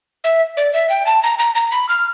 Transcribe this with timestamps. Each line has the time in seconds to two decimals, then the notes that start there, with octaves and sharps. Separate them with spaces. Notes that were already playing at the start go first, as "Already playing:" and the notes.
0.24 E5
0.57 D5
0.73 E5
0.90 G5
1.06 A5
1.23 A#5
1.39 A#5
1.55 A#5
1.72 B5
1.89 F6